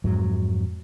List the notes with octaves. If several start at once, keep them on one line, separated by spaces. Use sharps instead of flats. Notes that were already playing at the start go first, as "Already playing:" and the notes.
F2 G#2 F#3